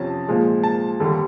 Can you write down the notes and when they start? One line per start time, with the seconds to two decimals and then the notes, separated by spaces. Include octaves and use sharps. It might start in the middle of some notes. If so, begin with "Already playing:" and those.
Already playing: F2 C3 F3 C#4 A5
0.28 A#2 F3 G#3
0.64 A5
1.00 D#2 D3 G3